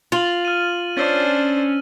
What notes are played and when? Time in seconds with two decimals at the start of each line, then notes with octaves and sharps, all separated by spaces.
0.12 F4 A6 F#7
0.45 F6 D#7
0.97 C#4 D4 C5 E6 A6